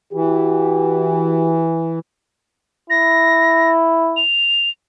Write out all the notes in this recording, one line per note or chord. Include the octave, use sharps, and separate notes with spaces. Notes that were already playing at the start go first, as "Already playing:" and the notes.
E3 F#4 G4
E4 A#6
F7